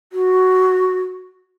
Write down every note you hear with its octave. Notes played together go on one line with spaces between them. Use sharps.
F#4